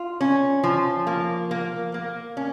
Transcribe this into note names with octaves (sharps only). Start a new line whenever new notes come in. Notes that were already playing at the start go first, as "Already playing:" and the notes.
Already playing: F4
C#4
F3
A#3
A#3
A#3
C#4